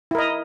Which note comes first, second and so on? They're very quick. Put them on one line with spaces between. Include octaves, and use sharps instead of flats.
E4 A#4 D#5